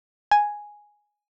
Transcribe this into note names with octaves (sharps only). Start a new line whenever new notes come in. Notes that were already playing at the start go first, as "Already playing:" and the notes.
G#5